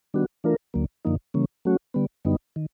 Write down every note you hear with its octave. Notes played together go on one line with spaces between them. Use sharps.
D#3 G3 B3 D4 F#4
E3 A3 D4 F4 A#4
D2 D3 F#3 A#3
F#2 D3 F3 A#3 D#4
C#3 E3 G3 A#3 C#4
F#3 A3 C#4 F#4
D3 G3 B3
F#2 D3 G3 B3 D#4
D#3